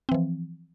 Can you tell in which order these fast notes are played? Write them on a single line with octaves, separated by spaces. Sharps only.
C4 E3 F3